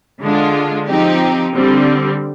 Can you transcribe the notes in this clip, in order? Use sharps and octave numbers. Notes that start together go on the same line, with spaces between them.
D3 G#3 D4 F4
F3 C4 D#4 G4
D3 G3 C4